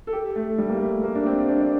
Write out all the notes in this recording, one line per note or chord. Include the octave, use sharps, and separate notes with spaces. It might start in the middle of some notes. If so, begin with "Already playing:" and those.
A4
G4
A3
G3
A#3
A3
A#3
D4
C4
D4
D4